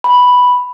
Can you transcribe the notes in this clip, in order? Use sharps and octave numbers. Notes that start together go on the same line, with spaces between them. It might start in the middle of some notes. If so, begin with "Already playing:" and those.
B5